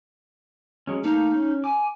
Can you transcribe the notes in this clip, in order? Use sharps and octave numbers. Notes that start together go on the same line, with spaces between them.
F#3 G#3 C#4
A3 A#3 D#4 F5
C#4
G#5 D6